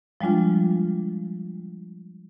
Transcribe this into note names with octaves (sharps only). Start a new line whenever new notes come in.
F3 G3 G#3 D4 F4